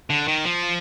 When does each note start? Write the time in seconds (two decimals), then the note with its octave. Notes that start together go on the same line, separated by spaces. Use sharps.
0.10 D3
0.28 D#3
0.45 F3